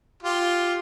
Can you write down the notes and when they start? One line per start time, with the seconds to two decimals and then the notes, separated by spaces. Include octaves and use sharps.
0.23 F4 G4